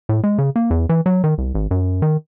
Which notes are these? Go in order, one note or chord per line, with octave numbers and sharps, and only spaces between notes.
A2
G#3
C#3
A#3
E2
E3
F#3
D#3
C2
G#1
F#2
D#3